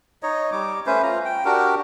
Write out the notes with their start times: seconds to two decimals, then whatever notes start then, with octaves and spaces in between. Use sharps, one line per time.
0.23 D#4 C#5 D#5
0.52 G3 D6
0.86 A3 C#4 B4 C5
1.03 F4 A#5
1.25 G5
1.45 D4 F#4 G4 A#4